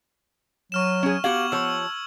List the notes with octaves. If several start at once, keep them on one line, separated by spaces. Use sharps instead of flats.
F#3 C#6 F6 E7
C#4 G#4
B3 F#4 G4 F5 G#6 F#7
F3 C#5 E6